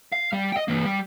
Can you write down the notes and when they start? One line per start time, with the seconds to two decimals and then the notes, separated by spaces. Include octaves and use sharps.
0.12 F5
0.33 G3
0.52 D#5 G5
0.68 E3 A#3
0.86 G3